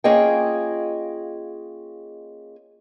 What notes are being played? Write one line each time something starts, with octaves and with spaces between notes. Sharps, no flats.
A#3 C#4 F4 G#4 D#5 G5